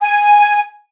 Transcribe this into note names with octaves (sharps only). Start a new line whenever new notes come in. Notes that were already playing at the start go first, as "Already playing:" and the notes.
G#5